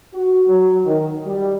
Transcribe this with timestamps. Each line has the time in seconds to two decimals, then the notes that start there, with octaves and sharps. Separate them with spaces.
0.14 F#4
0.47 F#3
0.86 D#3
1.26 G3